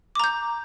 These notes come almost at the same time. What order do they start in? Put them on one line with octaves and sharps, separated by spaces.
D6 A#5 G6